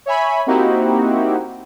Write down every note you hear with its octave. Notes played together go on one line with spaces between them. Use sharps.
C#5 E5 G#5 B5
A#3 C4 D#4 E4 F#4 G4